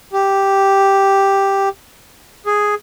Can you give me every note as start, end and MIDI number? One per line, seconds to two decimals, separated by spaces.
0.13 1.69 67
2.46 2.75 68